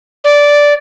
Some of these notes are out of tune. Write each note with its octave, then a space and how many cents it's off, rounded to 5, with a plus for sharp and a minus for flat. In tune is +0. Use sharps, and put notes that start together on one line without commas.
D5 -10